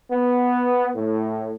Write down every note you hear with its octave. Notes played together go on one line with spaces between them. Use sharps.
B3
A2